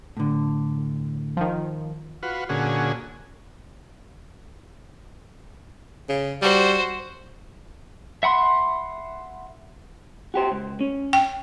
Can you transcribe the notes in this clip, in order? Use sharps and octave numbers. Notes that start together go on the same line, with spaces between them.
A2 D3
D#3 F3
F4 F#4 B4
A#2 D3 C#4 F#4 G#4
C#3
G3 F#4 C5
E5 F#5 B5 C6
F#4 G4 C5
C#2
C#4
G5